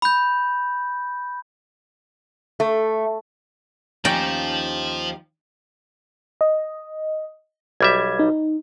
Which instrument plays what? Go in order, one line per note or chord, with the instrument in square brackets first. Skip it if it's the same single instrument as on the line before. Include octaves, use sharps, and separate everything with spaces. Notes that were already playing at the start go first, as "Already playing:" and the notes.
[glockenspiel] B5 G6
[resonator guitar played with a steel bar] A3
[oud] D#2 C#4 [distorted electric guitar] F3 [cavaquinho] D#4 G4 [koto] D5 G5
[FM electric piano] D#5
[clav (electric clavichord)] B1 G3 E5 [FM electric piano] G#6
[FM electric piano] D#4